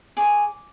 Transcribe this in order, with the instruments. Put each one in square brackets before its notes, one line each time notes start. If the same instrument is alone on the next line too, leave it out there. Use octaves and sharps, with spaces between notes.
[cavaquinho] G#4 C#5 D6